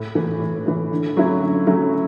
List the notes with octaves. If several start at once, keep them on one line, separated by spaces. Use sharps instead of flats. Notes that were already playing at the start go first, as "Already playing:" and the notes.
Already playing: A2
E3 A3
A2
E3 A3
D3
F#3 A3 C#4 E4
D3
F#3 A3 C#4 E4